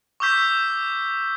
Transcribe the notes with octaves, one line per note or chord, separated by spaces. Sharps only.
C#6 D6 E6 G6 B6